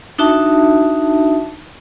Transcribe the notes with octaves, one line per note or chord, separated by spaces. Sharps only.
D4 D#4 F#4 E5 A5